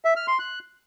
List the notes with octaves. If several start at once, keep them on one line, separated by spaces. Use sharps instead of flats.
E5
F6
C6
F#6